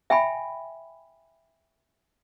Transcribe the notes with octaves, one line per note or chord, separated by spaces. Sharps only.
E5 G5 G#5 B5